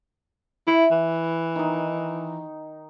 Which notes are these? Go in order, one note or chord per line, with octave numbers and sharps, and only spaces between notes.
E4 E5
E3
D#3 D#4